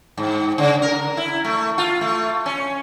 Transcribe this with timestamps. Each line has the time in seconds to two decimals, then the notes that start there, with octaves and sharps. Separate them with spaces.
0.17 G#2
0.58 C#3
0.82 A#4
1.17 E4
1.44 A3
1.78 F4
2.01 A3
2.46 C#4